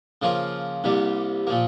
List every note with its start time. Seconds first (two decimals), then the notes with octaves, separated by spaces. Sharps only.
0.22 C#3 F3 A#3 F4 A#4
0.84 C2 C3 G3 A#3
1.47 A#2 F3 A#3